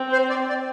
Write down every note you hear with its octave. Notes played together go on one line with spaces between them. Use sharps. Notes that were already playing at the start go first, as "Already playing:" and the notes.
Already playing: C4
C5
D5
D5